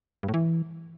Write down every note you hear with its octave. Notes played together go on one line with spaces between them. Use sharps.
G2
A2
E3